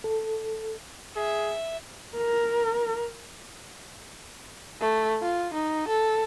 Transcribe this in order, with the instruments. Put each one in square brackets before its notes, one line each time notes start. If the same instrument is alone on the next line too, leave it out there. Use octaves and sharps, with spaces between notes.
[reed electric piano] A4
[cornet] G#4 [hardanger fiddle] E5
[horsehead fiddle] A#4
[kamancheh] A3
F4
D#4
A4